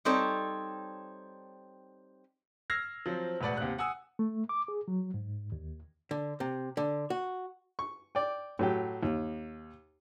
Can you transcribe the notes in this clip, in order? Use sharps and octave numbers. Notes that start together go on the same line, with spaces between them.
G3 C4 D#4 A4 C#5
E6 F6 G#6 A#6 C7
F3 F#3 C4
E1 A2 B4 D5 F#5
D#2 C3 F#5 F#6
F#5 G#5 D#6 E6
A3
D6
G#4
F#3
G#2
D#2
D3
C3
D3
F#4
C#6
D5 G5
A2 F#3 G4
D#2